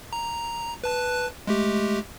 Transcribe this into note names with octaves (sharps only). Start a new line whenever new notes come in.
A#5
B4 A5 F#6
G#3 A3 G4